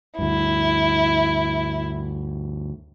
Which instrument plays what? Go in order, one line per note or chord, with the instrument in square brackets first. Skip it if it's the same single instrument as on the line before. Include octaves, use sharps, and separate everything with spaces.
[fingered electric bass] D2 G2 [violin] E4